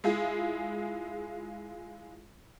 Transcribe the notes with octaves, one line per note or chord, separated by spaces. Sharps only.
G#3 E4 F4 G#4